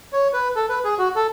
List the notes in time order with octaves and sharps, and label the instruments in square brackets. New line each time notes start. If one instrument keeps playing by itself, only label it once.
[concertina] C#5
B4
A4
B4
G#4
F#4
A4